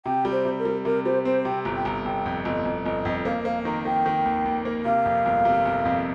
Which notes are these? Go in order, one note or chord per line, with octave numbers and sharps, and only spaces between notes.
C3 G5
G3
C5
C3
A#4
G3
C3 A#4
G3 C5
C4 C5
C3 G5
G1 A#5
G5
G1 A#5
G1 G5
F2
G1 D#5
G1
G1 D#5
F2
A#3 F5
A#3 F5
D#3 A#5
D#3 G5
D#3
D#2
D#2
A#3
C3 F5
F2
G1
C3
G1
F2